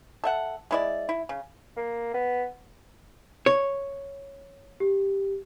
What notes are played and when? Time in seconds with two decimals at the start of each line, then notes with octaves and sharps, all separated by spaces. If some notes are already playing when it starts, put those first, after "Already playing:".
0.24 A4 E5 F#5
0.71 G#3 E4 D5
1.09 E4
1.29 C#3
1.77 A#3
2.14 B3
3.46 C#5
4.80 G4